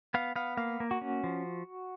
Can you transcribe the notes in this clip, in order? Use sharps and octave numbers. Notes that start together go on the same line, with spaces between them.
B3 F5
B3 F5
A#3 F5
A#3
F#4
C#4
F3